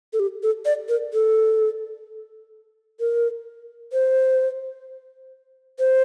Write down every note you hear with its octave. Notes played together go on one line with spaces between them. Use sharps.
A4
G4
A4
D5
A#4
A4
A#4
C5
C5